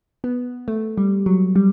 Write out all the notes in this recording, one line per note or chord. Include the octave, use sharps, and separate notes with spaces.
B3
A3
G3
F#3
G3